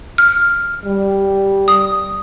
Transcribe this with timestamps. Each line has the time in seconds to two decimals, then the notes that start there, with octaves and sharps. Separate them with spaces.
0.18 F6
0.85 G3
1.68 D#6